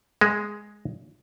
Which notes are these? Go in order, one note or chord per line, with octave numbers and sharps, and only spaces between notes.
G#3